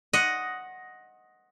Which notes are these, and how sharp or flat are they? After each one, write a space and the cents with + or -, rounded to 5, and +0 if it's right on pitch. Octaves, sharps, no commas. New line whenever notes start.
D#5 +5 F#5 +0 C6 +40